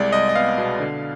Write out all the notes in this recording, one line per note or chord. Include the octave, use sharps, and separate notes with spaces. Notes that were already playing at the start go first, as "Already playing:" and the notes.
Already playing: C2 G#3 D5
C2 D#5
D#5
B3 F5
B2
D3